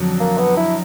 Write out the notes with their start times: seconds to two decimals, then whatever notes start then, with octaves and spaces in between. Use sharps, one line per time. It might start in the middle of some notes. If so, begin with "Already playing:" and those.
Already playing: F2 D3 F#3
0.20 A#3
0.38 B3
0.57 E4